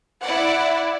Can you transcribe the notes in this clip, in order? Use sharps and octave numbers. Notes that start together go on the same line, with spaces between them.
E4 D5 F#5